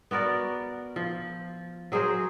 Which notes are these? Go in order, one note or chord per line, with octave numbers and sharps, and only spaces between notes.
B3 F#4 A#4 D5
F3
F#3 G#4 A#4 C5